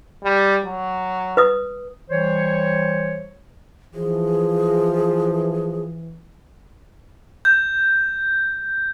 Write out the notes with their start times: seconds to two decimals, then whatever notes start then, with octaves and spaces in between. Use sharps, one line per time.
0.24 G3
0.66 F#3
1.37 B4 D#6
2.10 E3 G3 C5 C#5
3.94 E3 F3 G#4
7.45 G6